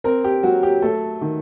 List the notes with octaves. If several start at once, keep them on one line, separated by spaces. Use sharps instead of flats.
C4 A#4
G4
F#3 F#4
G4
A3 A4
D#3